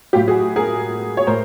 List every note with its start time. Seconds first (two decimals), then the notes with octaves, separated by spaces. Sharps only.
0.13 A2 F#3 F4 G4
0.28 F#4 G#4
0.56 G#4 A#4
1.17 C#5
1.27 A2 A#4 C5